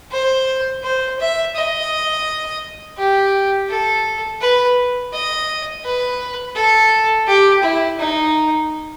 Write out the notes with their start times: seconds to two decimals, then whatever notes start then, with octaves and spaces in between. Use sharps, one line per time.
0.11 C5
0.83 C5
1.20 E5
1.55 D#5
2.98 G4
3.69 A4
4.41 B4
5.13 D#5
5.84 B4
6.56 A4
7.27 G4
7.63 E4
7.99 D#4